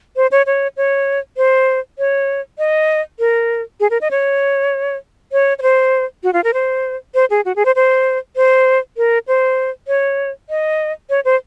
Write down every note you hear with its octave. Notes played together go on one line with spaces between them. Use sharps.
C5
C#5
C#5
C#5
C5
C#5
D#5
A#4
G#4
A#4
D#5
C#5
C#5
C#5
C5
F#4
F4
A#4
C5
C5
G#4
F#4
G#4
C5
C5
C5
A#4
C5
C#5
D#5
C#5
C5